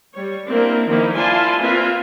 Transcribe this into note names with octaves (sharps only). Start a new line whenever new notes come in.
G3 C#5
A#3 C4 D4 E4 A#4
D#3 F3 A#3 D#4 E4
E4 F4 D5 G#5 A5 C6
A#3 C4 F4 B4 E5 G#5